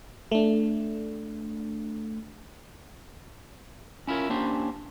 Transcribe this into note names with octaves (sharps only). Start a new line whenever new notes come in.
A3 D4
C#4 E4 F4 A#4 C#5
A#3 C#4 D4 G4 C5